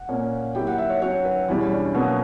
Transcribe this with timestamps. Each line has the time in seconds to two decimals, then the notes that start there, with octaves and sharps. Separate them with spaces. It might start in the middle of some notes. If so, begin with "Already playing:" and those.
Already playing: F#5
0.09 A#2 A#3 C#4
0.55 F#3 A#3 E4 G4 G5
0.67 F#5
0.78 E5
0.90 C#5
1.01 F#3 C#4 F#4 C#5
1.25 B4
1.48 E2 B2 G3 C#4 E4
1.72 D4
1.94 B2 F#3 A#3 B3 C#4